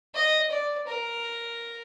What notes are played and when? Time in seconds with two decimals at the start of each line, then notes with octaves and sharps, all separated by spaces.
0.15 D#5
0.51 D5
0.87 A#4